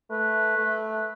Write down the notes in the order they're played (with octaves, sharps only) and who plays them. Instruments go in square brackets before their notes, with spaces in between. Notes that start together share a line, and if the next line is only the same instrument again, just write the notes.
[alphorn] A3 [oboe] B4
[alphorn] A3
[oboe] B4